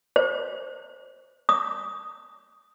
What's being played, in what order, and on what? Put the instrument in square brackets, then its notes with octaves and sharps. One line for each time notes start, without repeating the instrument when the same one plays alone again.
[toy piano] C5
D#6